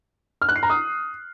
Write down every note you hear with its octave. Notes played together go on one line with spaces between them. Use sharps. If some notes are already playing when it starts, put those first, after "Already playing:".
F6
F#6
C7
A#5
D#6